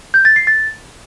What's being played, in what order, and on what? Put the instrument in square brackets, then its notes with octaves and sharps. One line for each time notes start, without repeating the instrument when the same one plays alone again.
[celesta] G6
A6
C7
A6